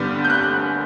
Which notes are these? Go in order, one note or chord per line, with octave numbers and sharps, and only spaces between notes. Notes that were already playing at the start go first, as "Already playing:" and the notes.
Already playing: G2 D3 G3 B3 D4 G6
G6
F#6